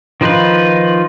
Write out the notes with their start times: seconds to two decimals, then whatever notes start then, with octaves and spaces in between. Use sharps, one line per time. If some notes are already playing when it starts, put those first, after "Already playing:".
0.21 D#3 F3 D#4 F4 B4